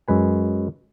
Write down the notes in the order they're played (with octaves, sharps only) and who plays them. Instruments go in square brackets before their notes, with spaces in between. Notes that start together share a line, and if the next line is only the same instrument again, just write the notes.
[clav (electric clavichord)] F#2 G#3 B4 G#5